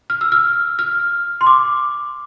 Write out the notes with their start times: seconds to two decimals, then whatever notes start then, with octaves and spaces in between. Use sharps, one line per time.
0.10 F6
0.21 E6
0.32 F6
0.79 F6
1.41 C6
1.47 D6